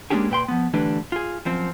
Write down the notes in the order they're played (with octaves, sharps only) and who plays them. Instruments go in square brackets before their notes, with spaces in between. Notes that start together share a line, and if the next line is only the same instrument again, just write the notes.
[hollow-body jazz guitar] G#3 A#3 C#4 D4 G4 G#4
A#2 B4 G5 C6
F3 B3
D3 E3 G3 A3 D4 B4
F4 G#4
F#2 F3 C4